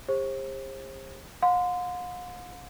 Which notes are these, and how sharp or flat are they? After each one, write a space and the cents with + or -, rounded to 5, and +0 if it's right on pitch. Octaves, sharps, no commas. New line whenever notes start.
G4 +45 C5 +40
F5 +45 C6 -25